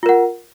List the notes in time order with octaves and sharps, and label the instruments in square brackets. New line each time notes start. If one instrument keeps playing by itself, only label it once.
[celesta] F4
A#4
F#5